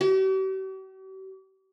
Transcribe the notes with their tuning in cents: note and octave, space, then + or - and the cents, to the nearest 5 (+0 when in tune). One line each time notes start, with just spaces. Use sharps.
G4 -45